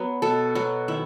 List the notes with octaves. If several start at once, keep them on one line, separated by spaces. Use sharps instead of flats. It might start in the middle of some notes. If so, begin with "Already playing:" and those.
Already playing: F#3 B3 B4
B2 A4
F#3 B3 F#4
D#3 E4